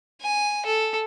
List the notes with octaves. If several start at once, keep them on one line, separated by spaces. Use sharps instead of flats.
G#5
A4